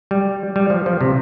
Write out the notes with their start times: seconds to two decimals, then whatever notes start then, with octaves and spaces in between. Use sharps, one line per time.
0.11 G3
0.56 G3
0.70 F3
0.86 F3
1.01 C3